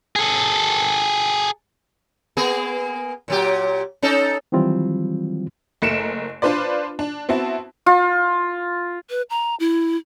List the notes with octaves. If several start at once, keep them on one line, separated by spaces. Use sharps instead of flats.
G#4 A4
A#3 B3 G#4
A#2 F#3 G4
C#4 D#4 A4
D#3 E3 F#3 G3 C4 F4
F#1 A3 A#4 C#7 D7 E7
D4 F4 B4 C5 D5
D4
B3 C4 E4 F#4 A5
F4
B4
A#5
E4